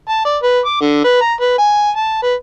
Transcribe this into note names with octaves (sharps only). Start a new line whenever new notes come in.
A5
D5
B4
D6
D3
B4
A#5
B4
G#5
A5
B4